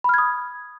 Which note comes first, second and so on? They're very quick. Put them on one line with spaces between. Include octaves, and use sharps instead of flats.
B5 F6 G#6 D#6